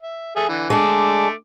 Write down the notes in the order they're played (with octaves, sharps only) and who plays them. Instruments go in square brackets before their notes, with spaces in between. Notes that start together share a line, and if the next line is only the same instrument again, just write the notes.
[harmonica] E5
G#4 A4 E5
D3 E3
[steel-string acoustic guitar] G#3 D4 [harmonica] A3 D6